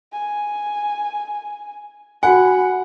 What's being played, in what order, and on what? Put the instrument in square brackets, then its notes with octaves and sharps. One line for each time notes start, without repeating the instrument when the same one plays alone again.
[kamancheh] G#5
[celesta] F#4 G#5 [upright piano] F#5 [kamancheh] B5